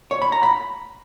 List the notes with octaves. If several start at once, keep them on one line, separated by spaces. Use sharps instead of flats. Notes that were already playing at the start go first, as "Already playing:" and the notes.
C#5
B5
A#5
B5